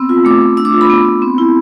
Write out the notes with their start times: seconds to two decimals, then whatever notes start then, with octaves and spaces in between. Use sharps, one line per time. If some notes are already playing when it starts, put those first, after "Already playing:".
Already playing: B3 C4 E6
0.09 F4
0.25 A3 D6
0.41 A3
0.57 D4 E6
0.65 D6
0.73 F4
0.81 B5
0.90 B3
1.05 B3
1.22 C4
1.38 E4